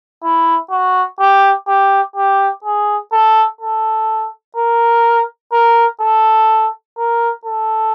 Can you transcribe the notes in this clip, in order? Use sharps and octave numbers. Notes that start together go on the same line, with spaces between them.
E4
F#4
G4
G4
G4
G#4
A4
A4
A#4
A#4
A4
A#4
A4